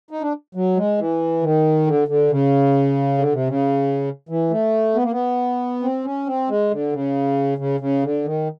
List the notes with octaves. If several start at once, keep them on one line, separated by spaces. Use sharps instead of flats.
D#4
D4
F#3
G#3
E3
D#3
D3
D3
C#3
D3
C3
C#3
E3
A3
B3
A#3
B3
C4
C#4
C4
G#3
D3
C#3
C#3
C#3
D3
D#3